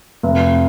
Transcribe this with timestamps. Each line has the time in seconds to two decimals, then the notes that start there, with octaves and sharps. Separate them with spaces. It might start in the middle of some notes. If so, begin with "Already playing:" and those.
0.23 F1